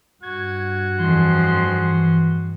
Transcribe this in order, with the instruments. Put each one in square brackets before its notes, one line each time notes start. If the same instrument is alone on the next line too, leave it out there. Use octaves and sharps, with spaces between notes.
[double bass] G2 [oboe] F#4 [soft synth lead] G#6
[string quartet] F2 G#4 C6 [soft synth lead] E3